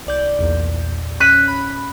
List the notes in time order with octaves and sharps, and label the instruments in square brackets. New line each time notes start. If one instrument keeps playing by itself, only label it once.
[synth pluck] C2 D5 G6
B1 E2 A#2
[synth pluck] C#4 [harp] F#6 B6 D#7
[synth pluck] B5